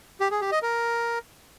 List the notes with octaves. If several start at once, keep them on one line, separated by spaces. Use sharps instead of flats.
G4
G#4
G4
D#5
A#4